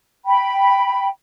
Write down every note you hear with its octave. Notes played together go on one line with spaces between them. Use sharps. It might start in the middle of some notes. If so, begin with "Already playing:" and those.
G5 B5